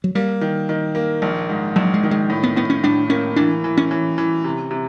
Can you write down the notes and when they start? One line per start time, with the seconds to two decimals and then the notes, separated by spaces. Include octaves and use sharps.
0.04 F#3
0.15 G3 A#3
0.41 D#3
0.69 D#3
0.95 A#3
1.22 A#1
1.49 G#2
1.76 A#1 F#3
1.94 G#3
2.03 D#3
2.11 G#3
2.30 A2
2.43 B3
2.56 A2 B3
2.70 C#4
2.84 A2 D4
3.10 A#3 C#4
3.36 E3 D4
3.64 E3
3.77 C#4
3.91 E3
4.18 E3
4.44 C3
4.71 C3